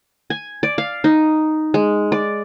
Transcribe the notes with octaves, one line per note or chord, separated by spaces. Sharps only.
G#5
D5
F5
D#4
G#3
D5